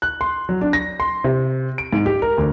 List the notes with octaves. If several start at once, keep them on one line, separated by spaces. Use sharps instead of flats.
F#6
C6
F#3
D4
A#6
C6
C3
D7
G#2
G4
A#4
D2